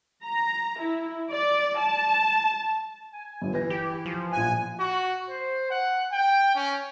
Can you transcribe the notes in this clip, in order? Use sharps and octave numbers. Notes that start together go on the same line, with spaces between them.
A#5
E4
D5
A5
G#5
G1 G2
E3 E4 B4 A#6
G4
F3
A#1 B3 G#5 F#6
F#4
C5
F#5
G5
C#4